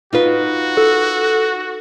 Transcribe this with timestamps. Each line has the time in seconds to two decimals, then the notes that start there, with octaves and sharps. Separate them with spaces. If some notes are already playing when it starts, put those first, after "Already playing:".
0.13 D#4 F4 F#4 B4
0.77 A4